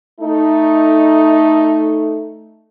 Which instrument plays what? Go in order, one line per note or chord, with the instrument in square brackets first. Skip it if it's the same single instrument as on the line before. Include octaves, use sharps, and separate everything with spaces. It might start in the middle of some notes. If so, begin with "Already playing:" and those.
[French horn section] A3 D#4